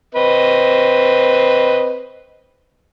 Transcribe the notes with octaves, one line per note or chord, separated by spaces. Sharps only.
C4 B4 D#5